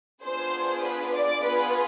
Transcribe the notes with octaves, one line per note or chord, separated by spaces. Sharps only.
B3 D4 F4 G#4 C5
B4
D5
B3 F4 G#4 B4